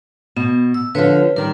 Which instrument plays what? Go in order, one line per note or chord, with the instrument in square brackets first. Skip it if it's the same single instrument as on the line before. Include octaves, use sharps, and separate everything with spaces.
[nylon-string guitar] B2 [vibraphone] B3
[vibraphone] E6
[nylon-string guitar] D3 F3 [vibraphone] B4 C#5
[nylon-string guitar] D#3 G3 [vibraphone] A#4